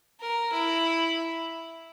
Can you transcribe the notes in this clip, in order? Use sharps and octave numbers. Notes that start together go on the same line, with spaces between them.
A#4
E4